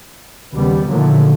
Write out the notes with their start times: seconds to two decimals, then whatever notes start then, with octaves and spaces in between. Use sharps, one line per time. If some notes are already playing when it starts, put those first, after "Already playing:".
0.55 D#2 C#3 G3 B3
0.89 A#2 D3 D#3 F3 F#3 A3